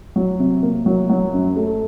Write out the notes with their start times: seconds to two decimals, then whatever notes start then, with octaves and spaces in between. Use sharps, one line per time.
0.16 F#3
0.39 C3
0.63 A#3
0.86 F#3
1.09 F#3
1.33 F#2
1.56 A3